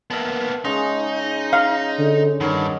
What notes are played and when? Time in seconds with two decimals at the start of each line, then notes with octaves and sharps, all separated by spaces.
0.11 A#3 B3 E5 A5
0.65 C#3 G#3 D#4
1.53 F5
1.99 D3
2.41 G2 D#3 D#4 C#5 F#5